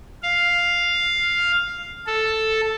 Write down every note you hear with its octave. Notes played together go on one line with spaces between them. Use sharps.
F5
A4